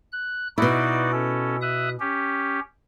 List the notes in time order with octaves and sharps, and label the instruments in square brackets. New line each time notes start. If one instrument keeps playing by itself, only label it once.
[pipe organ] F#6
[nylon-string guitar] B2 E4 [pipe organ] D#4 F#4 D5
[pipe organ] C#4 A4
E5 D#6 F#6
C#4 G4